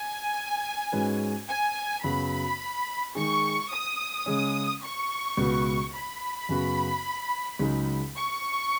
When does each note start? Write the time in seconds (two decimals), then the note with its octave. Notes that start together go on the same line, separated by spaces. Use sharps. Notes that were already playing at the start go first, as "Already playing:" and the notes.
Already playing: G#5
0.92 G#2 G#3 C#4 F#4 B4
1.48 G#5
2.03 F#2 C#3 F#3 B3 F#4 B5
3.15 D#3 G#3 D#4 G#4 C#6
3.71 D#6
4.26 C#3 G#3 C#4
4.83 C#6
5.37 C#2 B2 B3 F#4 B4
5.93 B5
6.49 F#2 C#3 B3 F#4
7.59 C#2 C#3 F#3 D#4 G#4
8.16 C#6